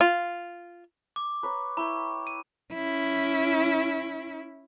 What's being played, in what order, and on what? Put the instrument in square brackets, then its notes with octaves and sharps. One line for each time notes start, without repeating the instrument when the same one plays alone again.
[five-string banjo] F4
[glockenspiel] D6
[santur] B4 C#5 A#5
[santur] E4 G5 [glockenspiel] A#5 C#6
[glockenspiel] D#7
[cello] C#4 E4